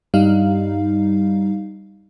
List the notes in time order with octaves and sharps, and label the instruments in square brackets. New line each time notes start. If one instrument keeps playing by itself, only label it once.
[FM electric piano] G2 G3 D#4 F5